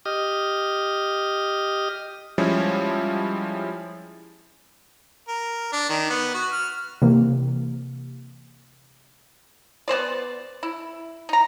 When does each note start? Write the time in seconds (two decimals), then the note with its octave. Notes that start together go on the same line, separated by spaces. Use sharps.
0.06 G4 D#5 D#6 F6
2.38 F3 G3 G#3 C#4 E4
5.28 A#4
5.73 D4
5.89 D#3
6.10 B3
6.34 F#4
6.52 F6
7.02 C3 E3 A#3
9.88 B3 C4 C5 D5
10.63 E4
11.29 D#4 A#5